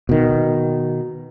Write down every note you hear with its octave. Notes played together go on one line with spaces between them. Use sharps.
B2 D#3